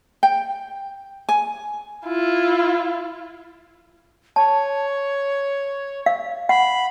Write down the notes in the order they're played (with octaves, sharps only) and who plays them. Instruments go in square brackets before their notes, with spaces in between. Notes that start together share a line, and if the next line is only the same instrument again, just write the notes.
[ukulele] G5
G#5
[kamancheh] E4 F4
[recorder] C#5 [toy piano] A5
[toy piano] F5
[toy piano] F#5 [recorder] B5